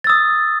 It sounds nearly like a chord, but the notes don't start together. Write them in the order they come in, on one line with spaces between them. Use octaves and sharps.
A6 E6 D#6